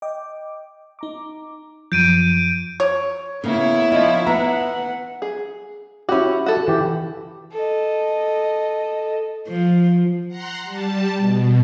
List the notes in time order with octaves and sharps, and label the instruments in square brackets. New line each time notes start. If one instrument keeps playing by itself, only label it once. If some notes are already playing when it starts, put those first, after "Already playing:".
[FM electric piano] D#5 G5 D6
D#4 A#5 D6
[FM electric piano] F#2 F3 [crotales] G6 D7 D#7
[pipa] C#5
[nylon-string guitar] C#3 A#3 [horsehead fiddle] B3 C#5 [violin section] E4
[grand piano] F3 D#4 [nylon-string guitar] F4
[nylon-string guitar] B3 [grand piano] E5 A#5 [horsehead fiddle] F#5
[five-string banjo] G#4
[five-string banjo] C#4 F#4 [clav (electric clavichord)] E4 G4
[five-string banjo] F#4 A4
[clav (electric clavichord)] E3 G4
[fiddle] A4 D#5
[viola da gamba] F3
[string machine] F#5 A#5 C6
G3 A5
B2